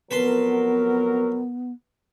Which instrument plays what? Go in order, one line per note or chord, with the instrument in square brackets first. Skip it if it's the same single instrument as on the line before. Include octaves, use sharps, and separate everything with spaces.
[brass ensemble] F2 F#3 A#4 [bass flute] B3 [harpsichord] B4 A5 C6